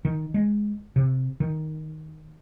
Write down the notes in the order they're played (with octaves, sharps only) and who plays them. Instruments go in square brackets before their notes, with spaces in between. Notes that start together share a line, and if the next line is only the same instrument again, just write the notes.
[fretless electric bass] D#3
G#3
C3
D#3